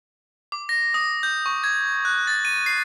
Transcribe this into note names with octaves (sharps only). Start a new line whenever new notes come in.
D6
A#6
D#6
G6
C#6
G#6
F#6
A6
D#7
C7